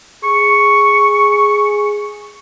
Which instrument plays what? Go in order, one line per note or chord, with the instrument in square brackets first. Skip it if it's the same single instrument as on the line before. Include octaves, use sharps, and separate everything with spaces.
[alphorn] G#4 [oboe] C#6